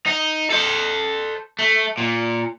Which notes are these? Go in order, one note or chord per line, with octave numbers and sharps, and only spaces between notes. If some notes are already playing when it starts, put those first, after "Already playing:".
D#4
A4 C5
A3
A#2